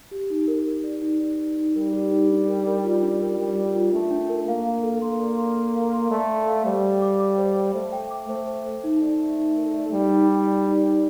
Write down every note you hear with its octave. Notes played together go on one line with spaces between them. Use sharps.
G4
D#4
A#4
A#4
D5
D#4
D5
D#4
D#4
G3 A#4
G4
D#4
D4
A#4
A#4
F4
D4
A#4
G3 A#4
A#4
F4
A3 D4
D4
A#4
A#3 F5
A4
A4
A#3 C6
D5
C6
A4
F5
C6
A3 D5
A4
F5
G3 C5
G5
D6
D6
C5
C5
A3 C5
G5
D6
A3 C5
C5
C5
A3 D#4
D5
D5
D#4
A#4
D5
G3 D#4
D#4
D#4
D5
D#4
D#4